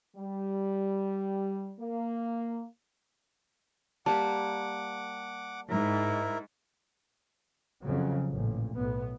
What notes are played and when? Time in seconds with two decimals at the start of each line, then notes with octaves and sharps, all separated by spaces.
0.17 G3
1.80 A#3
4.06 G3 A#3 G4 F#5 A5 D6
5.70 G#2 E4 A#4
7.83 F2 C#3 F#3
8.31 A1 A#2
8.76 B1 A2 B3